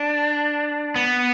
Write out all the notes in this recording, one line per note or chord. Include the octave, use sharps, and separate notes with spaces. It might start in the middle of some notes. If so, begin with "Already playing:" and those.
Already playing: D4
B3